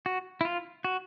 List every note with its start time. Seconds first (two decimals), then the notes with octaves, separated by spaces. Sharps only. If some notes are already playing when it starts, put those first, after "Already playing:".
0.06 F#4
0.41 E4
0.45 F4
0.85 F#4